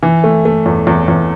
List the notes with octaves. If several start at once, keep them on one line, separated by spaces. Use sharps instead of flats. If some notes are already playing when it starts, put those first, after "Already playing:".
E3
A3
A3
E2
E2
E2